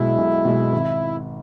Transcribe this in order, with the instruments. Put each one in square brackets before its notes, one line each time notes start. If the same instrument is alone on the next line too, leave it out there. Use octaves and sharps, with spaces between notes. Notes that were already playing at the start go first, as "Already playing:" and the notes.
Already playing: [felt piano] B1 B2 G#3 [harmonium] E4
[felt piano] B1
B2 G#3
G#1